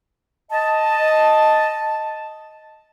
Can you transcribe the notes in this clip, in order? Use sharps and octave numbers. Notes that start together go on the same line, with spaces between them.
D#5 A5